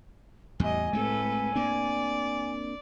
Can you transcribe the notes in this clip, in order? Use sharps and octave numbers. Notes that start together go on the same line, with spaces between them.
E2 A2 G3 D#5 G#5
A2 G#3 A3 C4 A4 B4
A#3 C4 D4 D5